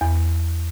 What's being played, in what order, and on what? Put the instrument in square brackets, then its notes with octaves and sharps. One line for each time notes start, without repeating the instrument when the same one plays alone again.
[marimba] E2